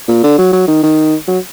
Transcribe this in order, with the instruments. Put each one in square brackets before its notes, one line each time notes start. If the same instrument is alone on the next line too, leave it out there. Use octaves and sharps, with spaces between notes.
[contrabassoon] A#2
D3
F#3
F#3
D#3
D#3
F#3